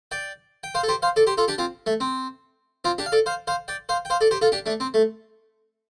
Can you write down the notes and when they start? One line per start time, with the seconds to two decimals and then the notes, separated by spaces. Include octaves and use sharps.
0.11 D5 G5
0.63 G5
0.75 C5 F5
0.83 A4
0.88 G4 C5
1.02 C5 F5
1.16 A4 D5
1.27 G4 C5
1.37 F4 A4
1.48 D4 G4
1.58 C4 F4
1.86 A3
2.00 C4
2.84 C4 F4
2.98 D4 G4
3.06 F5
3.12 A4 D5
3.26 C5 F5
3.47 C5 F5
3.68 D5 G5
3.89 C5 F5
4.05 G5
4.10 C5 F5
4.21 A4 D5
4.31 G4 C5
4.42 F4 A4
4.52 D4 G4
4.66 A3 D4
4.80 C4
4.94 A3